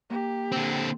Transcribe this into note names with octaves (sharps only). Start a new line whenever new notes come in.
A#3 G4
D3 C4